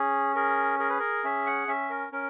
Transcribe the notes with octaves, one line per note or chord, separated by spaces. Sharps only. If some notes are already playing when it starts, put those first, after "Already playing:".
Already playing: C#4 G#4
G#4 A#4
G#4 A#4
B4
A#4
C#4 E5
F#5
C#4 E5
A#4
C#4 A#4